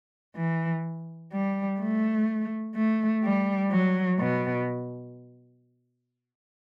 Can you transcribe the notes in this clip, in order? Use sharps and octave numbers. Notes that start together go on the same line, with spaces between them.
E3
G3
A3
A3
G3
F#3
B2